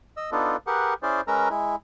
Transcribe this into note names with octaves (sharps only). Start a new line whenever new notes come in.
D#5 E6
B3 D4 D#4 F4 A4
G4 G#4 A#4 B4 F#5
C#4 E4 G#4 C5 D5
G#3 C#4 A#4 B4 A#5 E6
G#3 E4